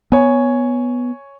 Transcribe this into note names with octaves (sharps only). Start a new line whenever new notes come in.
B3 C#5 G#5